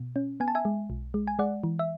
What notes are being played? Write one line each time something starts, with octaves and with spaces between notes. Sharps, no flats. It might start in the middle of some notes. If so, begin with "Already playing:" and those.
Already playing: B2
C#4
B3 G#5
A5
E5 G#5
G#3
B1
G#3
G#5
G#3 D5 F#5
E3
E5